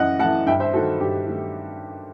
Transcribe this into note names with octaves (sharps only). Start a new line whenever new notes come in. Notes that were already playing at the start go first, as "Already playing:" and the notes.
Already playing: F#2 E3 A3 D#5 F#5
E3 A3 F#5 A5
G2 E5 G5
C5 E5
D#3 A3 F#4 A4
G2 G4
D#3 A3